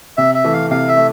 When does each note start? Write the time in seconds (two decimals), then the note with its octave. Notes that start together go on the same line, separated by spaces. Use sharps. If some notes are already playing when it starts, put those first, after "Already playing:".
0.17 C3 E5
0.35 E5
0.45 E3 A3
0.53 F5
0.71 C3 F5
0.88 E5
0.97 A3